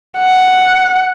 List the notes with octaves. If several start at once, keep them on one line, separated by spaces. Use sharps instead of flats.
F#5